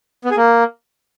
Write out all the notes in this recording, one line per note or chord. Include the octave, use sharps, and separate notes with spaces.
B3
G#4
A#3